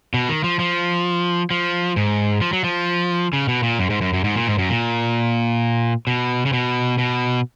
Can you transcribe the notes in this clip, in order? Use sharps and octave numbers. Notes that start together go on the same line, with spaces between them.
B2
D#3
F3
F3
F3
G#2
F3
F#3
F3
C#3
B2
A#2
F#2
G#2
F#2
F#2
G#2
A#2
G#2
F#2
A#2
B2
C#3
B2
B2